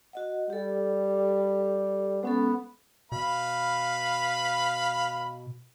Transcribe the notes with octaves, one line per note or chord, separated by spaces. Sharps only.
F#4 D#5 F#5
G3 G4 A4
G#3 B3 C#4 A4
B2 B4 F5 B5